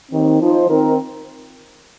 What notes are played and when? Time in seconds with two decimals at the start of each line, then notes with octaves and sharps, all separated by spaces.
0.12 D#2 D#3 C4
0.40 F3 D#4 C5
0.69 D#3 C4 D#4 A#4